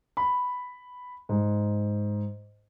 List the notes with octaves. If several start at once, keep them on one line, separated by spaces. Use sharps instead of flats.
B5
G#2